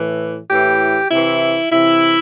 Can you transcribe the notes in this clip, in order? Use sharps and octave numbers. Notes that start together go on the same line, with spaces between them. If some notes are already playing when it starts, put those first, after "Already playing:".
Already playing: A2 E3
A2 E3 G4
C3 E3 E4
C3 E3 E4